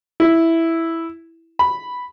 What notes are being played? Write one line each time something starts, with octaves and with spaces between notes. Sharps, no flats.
E4
B5